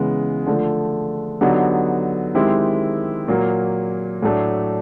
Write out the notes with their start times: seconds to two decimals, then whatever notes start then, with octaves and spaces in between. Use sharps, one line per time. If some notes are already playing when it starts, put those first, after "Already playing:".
Already playing: C#3 E3 G#3 B3
0.46 D3 F3 A3
1.41 D3 F#3 B3 D#4 G4
2.35 D#3 G#3 C4 E4 G4
3.28 A#2 F#3 A#3
4.22 A2 F#3 A3 D4